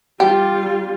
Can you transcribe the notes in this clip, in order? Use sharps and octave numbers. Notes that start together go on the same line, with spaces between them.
G3 F4 G4